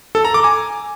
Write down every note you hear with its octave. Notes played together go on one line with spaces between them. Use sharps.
A4
A#5
D6
G#5